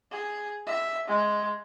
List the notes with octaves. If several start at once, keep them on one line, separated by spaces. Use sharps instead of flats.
G#4
E5
G#3